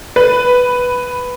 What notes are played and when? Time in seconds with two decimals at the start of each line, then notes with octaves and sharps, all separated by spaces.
0.16 B4